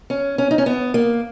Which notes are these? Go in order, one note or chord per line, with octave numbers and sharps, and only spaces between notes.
C#4
C#4
D#4
C#4
B3
A#3